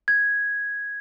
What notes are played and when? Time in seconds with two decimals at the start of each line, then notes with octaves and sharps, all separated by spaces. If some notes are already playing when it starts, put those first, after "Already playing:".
0.08 G#6